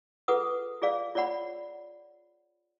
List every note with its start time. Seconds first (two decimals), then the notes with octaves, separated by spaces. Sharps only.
0.28 F4 G#4 A4 B4 F#5 D#6
0.82 F4 G#4 D5 F5
1.15 F4 C#5 D5 F#5 B5